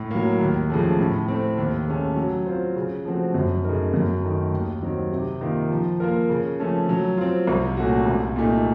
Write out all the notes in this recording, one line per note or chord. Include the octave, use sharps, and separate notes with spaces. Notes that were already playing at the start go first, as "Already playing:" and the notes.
Already playing: A2
F#3 A#3
D#2
C#3 F3 A3
A2
A3 C4
D#2
C#3 A3 C#4 A4
F#3
C4 F4 C5
C#3
F3 A3 C4 F#4
F#2
C#3 A3 D#4 A#4
F#2
D#3 A3
D#2
D#3 F#3 C4
C3
D#3 A#3 F4
F3
A#3 F4 A#4
C#3
F3 A3 C#4 A4
F#3
C4 F4
C2
A#2 A3 C#4 F#4
C2
A#2 A3 D#4